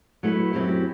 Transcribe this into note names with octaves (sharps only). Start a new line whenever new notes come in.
F#3 A3 E4 B4
F#2 F#3 C4 E4 G4